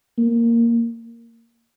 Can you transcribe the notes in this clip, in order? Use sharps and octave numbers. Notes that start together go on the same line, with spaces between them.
A#3